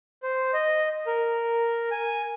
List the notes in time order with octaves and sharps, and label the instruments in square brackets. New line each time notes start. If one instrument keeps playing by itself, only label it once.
[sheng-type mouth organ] C5
D#5
A#4
G#5